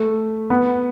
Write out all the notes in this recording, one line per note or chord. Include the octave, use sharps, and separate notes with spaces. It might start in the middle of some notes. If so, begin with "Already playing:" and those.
Already playing: A3
B3